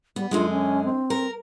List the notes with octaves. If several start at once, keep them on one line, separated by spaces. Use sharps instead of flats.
G3 B3
F#2 D3 G#3 F4
C#4
C4
A#4